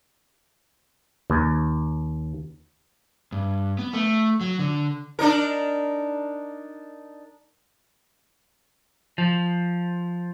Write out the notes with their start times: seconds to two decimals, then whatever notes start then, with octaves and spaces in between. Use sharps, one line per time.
1.30 D#2
3.32 G2
3.79 B3
3.93 A3
4.41 F#3
4.59 D3
5.19 D4 D#4 A#4
9.18 F3